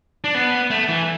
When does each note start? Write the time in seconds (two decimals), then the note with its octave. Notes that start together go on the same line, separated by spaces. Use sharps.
0.24 D4
0.35 B3
0.70 A3
0.89 E3